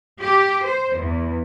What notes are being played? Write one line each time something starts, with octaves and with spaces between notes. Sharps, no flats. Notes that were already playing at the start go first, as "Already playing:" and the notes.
G4
C5
E2